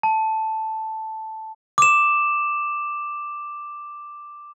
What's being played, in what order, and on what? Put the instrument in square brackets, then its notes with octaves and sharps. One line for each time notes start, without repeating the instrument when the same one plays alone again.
[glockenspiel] A5
D6 E7